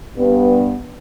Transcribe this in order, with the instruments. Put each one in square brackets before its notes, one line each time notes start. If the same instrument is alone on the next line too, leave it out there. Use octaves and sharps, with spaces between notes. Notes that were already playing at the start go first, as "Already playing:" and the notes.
[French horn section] G2 B3